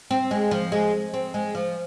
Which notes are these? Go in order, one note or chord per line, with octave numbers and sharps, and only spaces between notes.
C4
G#3
F3
G#3
C4
G#3
F3